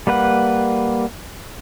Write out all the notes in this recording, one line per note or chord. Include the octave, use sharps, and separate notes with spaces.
G3 A#3 B4 F#5